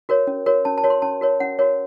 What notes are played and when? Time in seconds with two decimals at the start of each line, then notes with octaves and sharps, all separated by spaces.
0.09 F#4 A#4 C#5
0.27 C#4
0.46 F#4 A#4 C#5
0.65 C#4 A5
0.78 A5
0.84 F#4 A#4 C#5
0.90 C6
1.02 C#4 A5
1.21 F#4 A#4 C#5
1.40 C#4 F#5
1.59 F#4 A#4 C#5